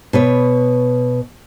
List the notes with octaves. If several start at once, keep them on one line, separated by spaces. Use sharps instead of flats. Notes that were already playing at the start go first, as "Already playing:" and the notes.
B2 B4 C#5